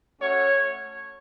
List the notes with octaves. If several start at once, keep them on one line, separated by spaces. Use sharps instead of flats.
A3 C#4 F#4 C#5